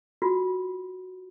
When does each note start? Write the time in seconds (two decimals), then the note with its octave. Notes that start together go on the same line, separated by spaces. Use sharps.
0.22 F4 F#4